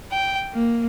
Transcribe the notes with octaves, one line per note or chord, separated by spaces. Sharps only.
G5
A#3